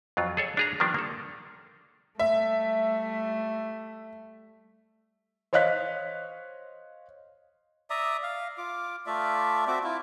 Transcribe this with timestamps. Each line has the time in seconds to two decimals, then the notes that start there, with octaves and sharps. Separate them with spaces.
0.17 F2 F#3 F4
0.37 G#4 A4 C#5
0.57 D4 G#4 A#5
0.80 D#3 F3 G3 A#3 B3 D4
0.94 A#3 A4
2.19 G3 A3 E5
5.53 C5 C#5 D#5 F5 F#6 B6
7.90 D5 E5 A#5 D#6
8.23 F5
8.58 F4 D6
9.06 A3 F4 D5 E5
9.67 C4 F#4 E5 D6
9.84 E4 F4